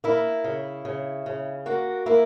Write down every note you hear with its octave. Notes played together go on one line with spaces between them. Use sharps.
A#3 E4
C#3
C#3
C#3
A#3 F#4
A#3 E4